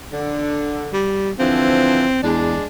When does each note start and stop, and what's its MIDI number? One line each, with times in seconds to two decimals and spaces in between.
0.12 0.90 50
0.93 1.31 55
1.39 2.06 50
1.39 2.06 52
1.39 2.06 53
1.39 2.21 60
2.23 2.56 40
2.23 2.65 56
2.23 2.65 62